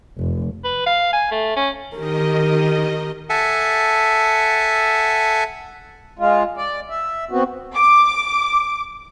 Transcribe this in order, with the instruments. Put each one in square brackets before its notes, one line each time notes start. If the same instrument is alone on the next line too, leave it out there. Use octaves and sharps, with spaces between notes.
[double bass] F1
[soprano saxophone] B4
F5
G#5
A3
C#4
[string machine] D#3 D#5 [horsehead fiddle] G4 A#4
[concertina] A4 E5 F#5 G#5 A5
[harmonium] G#3 F4
D5
E5
B3 C4 F#4
[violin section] D6